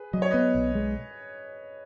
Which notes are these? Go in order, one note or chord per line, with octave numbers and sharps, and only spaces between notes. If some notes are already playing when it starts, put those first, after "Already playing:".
Already playing: G#4 B4
F#3 D#5
C#5
B3 B4 D#5
B1
G#3